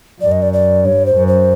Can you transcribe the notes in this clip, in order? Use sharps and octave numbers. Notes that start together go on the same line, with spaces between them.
F#2 D5
D#5
D5
D5
G2 C#5
C5
F#2
C5